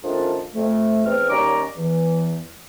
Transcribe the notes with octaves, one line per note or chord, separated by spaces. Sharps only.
D#3 F3 A3 C#4 D4 F4
F2 A3
E2 C4 F6
D#2 G3 C#4 A#5 D6
E2 E3